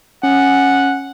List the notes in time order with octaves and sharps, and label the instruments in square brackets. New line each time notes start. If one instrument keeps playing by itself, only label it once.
[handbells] C#4 [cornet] F#5